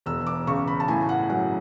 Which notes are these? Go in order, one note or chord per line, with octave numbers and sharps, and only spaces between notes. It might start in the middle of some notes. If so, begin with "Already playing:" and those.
E1 E6
D6
C#3 C#6
B5
A5
A2 G#5
F#5
F#3 F#5